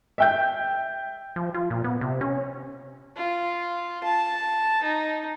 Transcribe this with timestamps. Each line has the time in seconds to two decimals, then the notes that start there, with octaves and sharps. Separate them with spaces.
0.18 E5 G5 G6
1.36 F3
1.54 F4
1.70 A#2
1.84 B3
2.01 C3
2.21 C#4
3.17 F4
4.04 A5
4.83 D#4